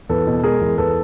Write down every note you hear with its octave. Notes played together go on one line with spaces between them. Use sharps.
E2 A4 B4
B2
G#3 G#4 A#4
E2
E2 A4 B4